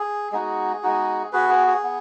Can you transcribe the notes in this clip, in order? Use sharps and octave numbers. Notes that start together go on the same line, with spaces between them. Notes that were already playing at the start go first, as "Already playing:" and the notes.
Already playing: G#4
G#3 B3 D#4 F#4 G#4
G#3 B3 D#4 F#4
B3 F#4 G#4 B4
G#4
G#4
B3